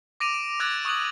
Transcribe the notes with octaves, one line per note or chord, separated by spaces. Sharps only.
D6 A#6 D7 D#7 F7
D7
D6 E6 F#6 G#6 A6 D7
C#6 D#6 F#6 D7 F#7